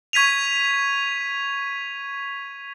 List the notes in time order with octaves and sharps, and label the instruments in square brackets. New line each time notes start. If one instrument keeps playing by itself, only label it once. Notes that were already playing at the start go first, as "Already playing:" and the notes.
[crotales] C#6 G#6 B6 D#7 F7